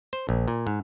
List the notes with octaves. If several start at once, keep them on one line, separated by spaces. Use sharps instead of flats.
C5
A#1
A#2
G#2